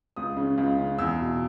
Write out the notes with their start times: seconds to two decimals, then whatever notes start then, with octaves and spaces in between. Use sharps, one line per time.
0.16 C#2 D#6
0.37 C#3
0.58 C#2
0.78 C#3
0.99 E2 E6
1.19 B2